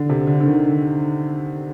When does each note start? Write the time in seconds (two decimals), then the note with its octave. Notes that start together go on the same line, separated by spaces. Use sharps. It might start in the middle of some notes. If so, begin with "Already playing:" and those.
Already playing: D3
0.09 C3
0.27 D3
0.40 D3
0.46 D#3